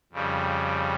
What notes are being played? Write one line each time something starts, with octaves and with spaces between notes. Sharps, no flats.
F2 C#3 G3